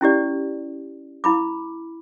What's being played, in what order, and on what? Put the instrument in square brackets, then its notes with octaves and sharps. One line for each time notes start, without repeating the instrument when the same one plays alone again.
[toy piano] C#4 E4 G4 D5
E4 B5 D6